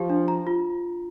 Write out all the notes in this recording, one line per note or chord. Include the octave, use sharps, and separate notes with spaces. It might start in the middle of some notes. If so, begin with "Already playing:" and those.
Already playing: F3 G4
D4
A#5
F4